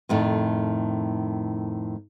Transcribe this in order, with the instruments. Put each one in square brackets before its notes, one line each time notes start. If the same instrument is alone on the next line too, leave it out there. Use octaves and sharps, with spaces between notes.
[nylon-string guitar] F2 A2 D#3